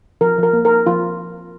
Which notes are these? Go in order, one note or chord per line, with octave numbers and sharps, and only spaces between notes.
F3 A#4
F3
A#4
A#3
A#4
A#3
F3 F4